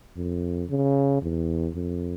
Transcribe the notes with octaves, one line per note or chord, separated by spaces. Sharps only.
F2
C#3
E2
F2